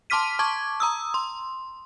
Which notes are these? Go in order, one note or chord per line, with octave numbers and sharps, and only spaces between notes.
A5 C6 D6 F6 B6 D#7
A5 C#6 D6 G#6
A#5 D#6 E6
C6